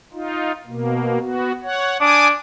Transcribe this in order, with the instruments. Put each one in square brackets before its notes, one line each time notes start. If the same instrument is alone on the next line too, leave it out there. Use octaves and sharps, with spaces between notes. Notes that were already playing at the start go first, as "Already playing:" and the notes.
[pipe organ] D#4 F4
B2 A#3
B3 F#4
C#5 F#5
[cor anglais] D4 [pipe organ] G#5 D6 D#6